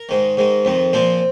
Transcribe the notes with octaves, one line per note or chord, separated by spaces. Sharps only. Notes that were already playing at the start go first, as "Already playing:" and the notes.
Already playing: A#4
G#2 D#3
G#2 D#3
F2 D#3
A#2 F3 C4